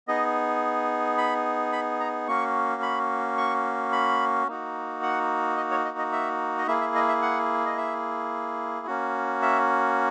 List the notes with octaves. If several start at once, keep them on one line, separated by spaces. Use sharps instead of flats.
B3 D#4 G#4 D#5
B5
B5
A#5
A#3 C#4 F#4 C#6
B5
C#6
B5
A#3 D#4 F#4
F#5
D#5
C#5
D#5
D#5
E5
D#5
A#3 E4 G#4 E5
E5
D#5
E5
F#5
D#5
E5
A#3 C#4 F#4
E5